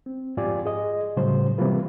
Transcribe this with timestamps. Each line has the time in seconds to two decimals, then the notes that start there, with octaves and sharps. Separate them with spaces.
0.06 C4
0.37 F2 G#2 F4 G4 D5 G#5
0.66 G#4 D#5
1.17 A2 C#3 F#3 G3 C5
1.58 C3 E3 G3 A#3 F4 B4